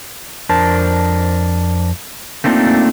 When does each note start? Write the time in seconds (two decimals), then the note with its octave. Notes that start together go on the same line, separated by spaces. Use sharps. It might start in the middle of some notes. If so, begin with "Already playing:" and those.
0.49 F2 D4 A#4 C5 A5
2.44 A3 A#3 C4 D4 D#4 F4